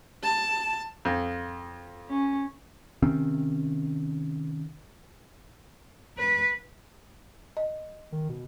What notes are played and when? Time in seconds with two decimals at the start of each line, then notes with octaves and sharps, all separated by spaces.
0.24 A5
1.05 F2
2.09 C#4
3.02 C3 D#3 C4 C#4
6.18 B4
7.57 D#5
8.12 D#3
8.29 B2